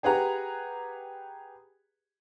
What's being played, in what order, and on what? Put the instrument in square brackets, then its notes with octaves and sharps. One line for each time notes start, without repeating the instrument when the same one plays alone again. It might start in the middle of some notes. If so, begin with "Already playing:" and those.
[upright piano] G4 G#4 B4 F#5 A#5